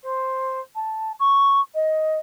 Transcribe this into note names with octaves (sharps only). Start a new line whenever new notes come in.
C5
A5
C#6
D#5